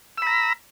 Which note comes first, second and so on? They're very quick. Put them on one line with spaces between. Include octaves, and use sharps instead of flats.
E6 B5 A#5